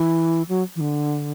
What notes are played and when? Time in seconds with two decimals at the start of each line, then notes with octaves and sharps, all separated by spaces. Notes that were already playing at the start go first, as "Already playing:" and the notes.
Already playing: E3
0.49 F#3
0.76 E3
0.81 D3